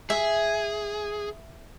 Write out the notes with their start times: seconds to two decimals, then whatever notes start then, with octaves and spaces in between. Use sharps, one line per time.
0.10 G#4 E5